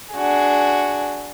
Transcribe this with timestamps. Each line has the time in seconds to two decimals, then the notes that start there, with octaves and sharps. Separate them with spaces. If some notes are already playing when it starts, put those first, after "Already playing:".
0.14 D4 F#4 G#4